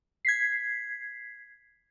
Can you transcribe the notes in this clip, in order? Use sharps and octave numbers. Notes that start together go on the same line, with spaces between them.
G#6 B6 C7